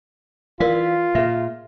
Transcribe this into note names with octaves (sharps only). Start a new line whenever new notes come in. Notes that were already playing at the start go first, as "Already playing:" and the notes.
E3 F4 A#4 D5 F5
A#2 G#4 E5